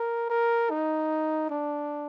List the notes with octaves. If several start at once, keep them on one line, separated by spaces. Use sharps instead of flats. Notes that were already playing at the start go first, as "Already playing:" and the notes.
Already playing: A#4
A#4
D#4
D4